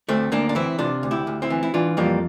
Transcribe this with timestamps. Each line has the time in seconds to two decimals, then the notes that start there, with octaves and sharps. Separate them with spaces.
0.09 D2 A3 C4
0.32 D2 A#3 D4
0.49 D4
0.55 E3 C4 E4
0.79 C3 D4 F4
1.03 D2
1.11 E4 G4
1.27 D2
1.42 C4 E4
1.50 E3
1.63 E4
1.74 E3 D4 F4
1.97 F2 G3 A#3